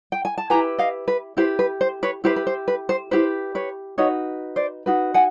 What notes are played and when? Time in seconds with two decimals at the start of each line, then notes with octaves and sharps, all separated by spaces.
0.12 G5
0.25 G#5
0.38 A5
0.50 E4 G4 B4 G#5 A#5
0.78 D#5 F5
1.08 B4
1.37 E4 G4 B4 C5
1.59 B4
1.81 C5
2.03 B4 C#5
2.24 E4 G4 B4 C5
2.36 B4
2.47 C5
2.68 B4
2.89 C5
3.11 E4 G4 B4 C5
3.55 B4 C#5
3.98 D#4 F#4 B4 C#5 D#5
4.56 C5 D5
4.86 D#4 F#4 B4
5.14 F#5 G#5